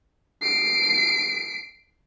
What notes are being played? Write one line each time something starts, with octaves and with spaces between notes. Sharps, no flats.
C7 D7